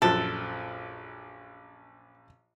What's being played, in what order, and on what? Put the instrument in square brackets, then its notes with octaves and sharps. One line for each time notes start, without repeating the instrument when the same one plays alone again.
[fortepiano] A#1 F#2 F3 [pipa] A4